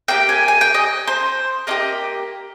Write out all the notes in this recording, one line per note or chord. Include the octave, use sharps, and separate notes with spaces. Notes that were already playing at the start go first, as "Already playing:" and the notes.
A#3 D#4 G4 G5
G#5
G#5
G5
D#5
C5
A#3 D4 G4 D#5